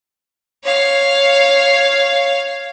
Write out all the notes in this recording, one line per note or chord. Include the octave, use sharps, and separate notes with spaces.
C#5 F5